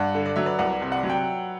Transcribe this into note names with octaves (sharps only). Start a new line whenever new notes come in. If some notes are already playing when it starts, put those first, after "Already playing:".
Already playing: G2 D5 F#5
D3
D5
F#3 E5
B4 D5
C2 D5 F#5
C3
D5 F#5
F#3
G5